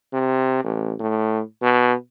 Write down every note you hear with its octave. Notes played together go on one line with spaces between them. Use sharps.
C3
A1
A2
B2